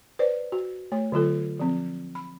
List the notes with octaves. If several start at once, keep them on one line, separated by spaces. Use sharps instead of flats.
B4 C5 D5
F#4
A3 C#5
D3 F#3 F4 A4
F3 C4
B5